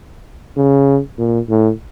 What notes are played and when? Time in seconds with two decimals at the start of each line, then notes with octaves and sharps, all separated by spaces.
0.57 C#3
1.18 A#2
1.49 A2